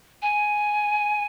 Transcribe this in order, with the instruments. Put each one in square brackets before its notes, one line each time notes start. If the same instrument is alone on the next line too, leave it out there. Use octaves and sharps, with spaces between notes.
[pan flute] G#5